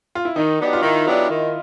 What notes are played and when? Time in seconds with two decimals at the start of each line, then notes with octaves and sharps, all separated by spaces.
0.15 F4
0.25 E4
0.36 D#3 D#4
0.60 F#3 B3 D4 G4
0.73 F4
0.83 D#3 E4
1.06 F#3 B3 D4 G4
1.30 D#3